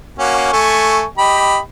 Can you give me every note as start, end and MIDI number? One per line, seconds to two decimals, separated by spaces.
0.19 0.50 58
0.19 0.50 61
0.19 0.50 66
0.53 1.04 57
0.53 1.04 80
0.53 1.04 85
1.18 1.58 67
1.18 1.58 75
1.18 1.58 83